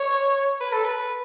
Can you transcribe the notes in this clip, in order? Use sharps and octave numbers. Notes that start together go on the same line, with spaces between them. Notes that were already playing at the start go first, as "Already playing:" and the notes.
Already playing: C#5
B4
A4
B4